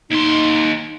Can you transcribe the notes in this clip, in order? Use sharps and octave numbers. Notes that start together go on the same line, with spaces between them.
D#2 D#4 C6